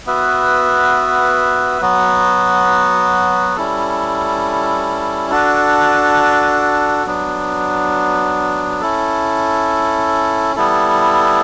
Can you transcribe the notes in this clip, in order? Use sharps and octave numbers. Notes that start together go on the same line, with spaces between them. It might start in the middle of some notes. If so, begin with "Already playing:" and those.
B3 F#4 B4 E5
F#3 B3 F#4
G3 C#4 E4 A4
D4 F#4 A4
F#3 B3 D4
C#4 E4 A4
G3 B3 E4 A4